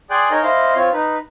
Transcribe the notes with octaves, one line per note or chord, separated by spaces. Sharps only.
G#4 D5 G5 G#5 C6 F#6
D#4 A#4 C#5 D#5 G#5
E4 C5 D#5 F5
C4 F4 C#5
D#4 B4